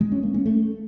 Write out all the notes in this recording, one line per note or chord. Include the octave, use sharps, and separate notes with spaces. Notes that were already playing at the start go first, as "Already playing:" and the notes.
G#3
C#4
A#3
C#4
A3